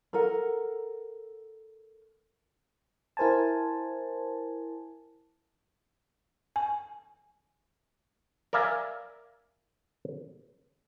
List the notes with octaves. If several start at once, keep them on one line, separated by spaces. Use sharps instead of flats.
A4 A#4 F#5
E4 A#4 C5 G#5 A5
G#5
A#4 D5 E5 F5 G#5 A#5